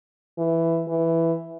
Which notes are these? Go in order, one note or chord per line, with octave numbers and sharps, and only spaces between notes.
E3
E3